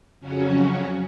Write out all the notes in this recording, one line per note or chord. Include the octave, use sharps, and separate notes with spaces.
F2 C#3 F#3 C#4 F#4